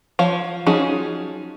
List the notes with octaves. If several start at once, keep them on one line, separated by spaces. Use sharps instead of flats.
F3 C#5 F5
F3 F#3 C#4 D#4 G#4